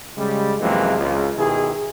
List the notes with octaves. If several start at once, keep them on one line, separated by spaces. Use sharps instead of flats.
C#3 G3 G#3
F#2 C3 E3 F3 G#3 A#3
C#2
B2 D#3 E4 G4 G#4